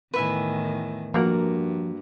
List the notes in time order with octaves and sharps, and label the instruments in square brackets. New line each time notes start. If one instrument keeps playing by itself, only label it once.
[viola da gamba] E2 A2 D#3 [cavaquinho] B4 E5 G#5
[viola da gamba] G2 [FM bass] F3 [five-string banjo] A#3 F#4 A#4